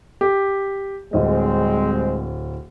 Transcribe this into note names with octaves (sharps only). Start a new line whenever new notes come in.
G4
D1 G3 G#3 C4 D#5